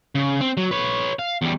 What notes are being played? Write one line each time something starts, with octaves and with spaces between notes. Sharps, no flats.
C#3
C4
F#3
B4 C#5
F5
E2 G3